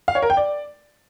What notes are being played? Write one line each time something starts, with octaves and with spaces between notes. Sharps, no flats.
F5
C#5
A#4
G5
D5